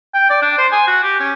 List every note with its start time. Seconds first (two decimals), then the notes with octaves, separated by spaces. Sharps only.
0.14 G5
0.30 D5
0.42 D4
0.58 C5
0.72 G#5
0.87 F#4
1.03 G4
1.20 C#4